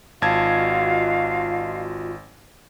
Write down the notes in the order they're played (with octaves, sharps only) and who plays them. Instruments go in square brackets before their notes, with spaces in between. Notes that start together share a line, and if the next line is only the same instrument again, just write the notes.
[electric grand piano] G#1 A5 G#6 [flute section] F4 F#4 D#5 [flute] F5